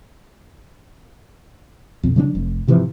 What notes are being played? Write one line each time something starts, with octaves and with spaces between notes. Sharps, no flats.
B1 F2
C#3 F#3 C4 D4
F1
G#2 C3 E3 F3